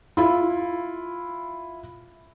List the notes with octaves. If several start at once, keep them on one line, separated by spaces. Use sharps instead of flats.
E4 F4